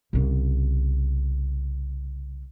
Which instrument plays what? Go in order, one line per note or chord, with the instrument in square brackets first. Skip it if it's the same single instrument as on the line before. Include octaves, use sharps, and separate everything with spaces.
[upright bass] C2 C#3